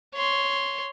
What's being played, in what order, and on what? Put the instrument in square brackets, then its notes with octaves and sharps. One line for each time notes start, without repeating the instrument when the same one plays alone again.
[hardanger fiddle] C#5 C6